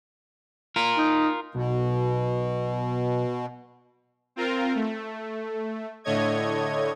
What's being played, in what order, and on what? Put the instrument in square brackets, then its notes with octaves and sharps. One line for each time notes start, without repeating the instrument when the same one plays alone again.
[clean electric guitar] F4 A#4
[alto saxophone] D#4
[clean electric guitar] B1 [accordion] B2
[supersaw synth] C4 F4 A#4
A3
A2 D3 A3 C#5 D#5 G#6